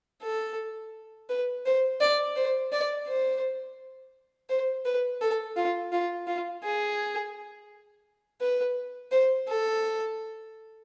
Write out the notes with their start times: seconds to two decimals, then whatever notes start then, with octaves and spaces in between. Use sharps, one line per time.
0.23 A4
1.29 B4
1.66 C5
2.01 D5
2.36 C5
2.72 D5
3.08 C5
4.49 C5
4.85 B4
5.21 A4
5.56 F4
5.92 F4
6.27 F4
6.63 G#4
8.41 B4
9.12 C5
9.48 A4